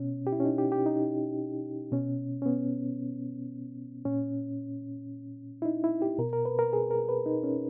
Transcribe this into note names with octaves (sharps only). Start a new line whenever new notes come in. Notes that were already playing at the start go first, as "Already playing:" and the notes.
Already playing: B2 C#4
G4
E4
C#4
D#4
G4
G4
D#4
B2 C#4
C#4
B3
A#2 C#4
E4
D#4
E4
G4
B2 A#4
A#4
B4
A#4
G#4
A#4
B4
D#4
C#4